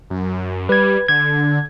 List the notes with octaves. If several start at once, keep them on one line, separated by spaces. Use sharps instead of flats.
F#2
G3 B4 G#6
D3 G#6